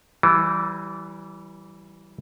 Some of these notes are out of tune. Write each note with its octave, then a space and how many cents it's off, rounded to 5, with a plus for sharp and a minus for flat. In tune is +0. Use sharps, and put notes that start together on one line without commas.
E3 +0 G3 -30